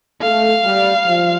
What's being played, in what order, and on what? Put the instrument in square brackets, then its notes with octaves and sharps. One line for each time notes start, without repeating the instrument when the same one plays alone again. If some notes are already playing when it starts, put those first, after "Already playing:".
[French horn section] A3 [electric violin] F5
[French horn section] G3
F3